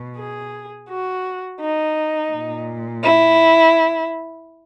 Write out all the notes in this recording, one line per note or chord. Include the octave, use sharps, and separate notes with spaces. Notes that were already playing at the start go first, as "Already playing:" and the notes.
Already playing: B2
G#4
F#4
D#4
A#2
E4